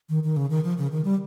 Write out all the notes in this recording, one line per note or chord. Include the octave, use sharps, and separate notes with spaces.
D#3
D#3
C#3
D#3
F3
C#3
D#3
G3